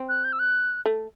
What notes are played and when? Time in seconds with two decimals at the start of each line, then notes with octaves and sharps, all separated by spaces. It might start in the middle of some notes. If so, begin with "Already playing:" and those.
Already playing: C4
0.09 F#6
0.24 G6
0.33 E6
0.39 F#6
0.85 A3